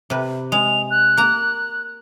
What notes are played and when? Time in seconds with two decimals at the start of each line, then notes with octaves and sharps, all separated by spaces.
0.10 C3 B4
0.52 G#3 F7
0.91 F#6
1.17 A#3 A#5